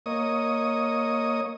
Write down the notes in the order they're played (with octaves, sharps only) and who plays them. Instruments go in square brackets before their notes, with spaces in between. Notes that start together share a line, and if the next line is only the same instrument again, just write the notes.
[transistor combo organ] A#3 C#5 D#5 D#6